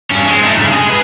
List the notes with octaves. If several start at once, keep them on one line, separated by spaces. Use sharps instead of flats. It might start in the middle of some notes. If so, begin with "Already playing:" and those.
G2 C#4
G#3 C4
A3 D#4
G2 C#3
G#4 D#5
G#4 B4